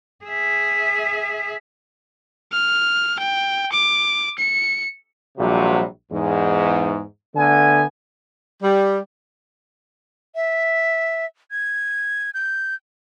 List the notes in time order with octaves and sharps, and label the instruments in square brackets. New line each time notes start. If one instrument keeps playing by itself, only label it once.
[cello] G#4 E5
[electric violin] F6
G5
D6
C#7
[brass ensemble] A#1 C3 F#3 G3 F#4
E2 G#2
D3 A3 B3 G#5
[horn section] G3
[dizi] E5
G#6
G6